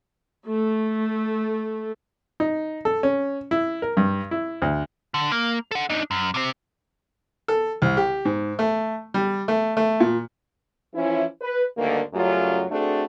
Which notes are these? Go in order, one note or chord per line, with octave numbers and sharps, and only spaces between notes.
A3
D#4
A4
C#4
E4
A#4
G2
E4
D2
D3
A#3
A4 F#5
D4 D#4
F#2
C3 C4
A4
C2
G4
G#2
A3
G3
A3
A3
A#2
E3 F3 C#4 E4
B4
D2 G2 D3 D#3 A#3
F#2 C#3 F#3 G3 A3 F4
A3 C4 D4 F#4 G#4 A4